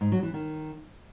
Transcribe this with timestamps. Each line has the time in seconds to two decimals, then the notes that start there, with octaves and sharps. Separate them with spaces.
0.01 G#2
0.12 F#3
0.23 E3
0.34 D#3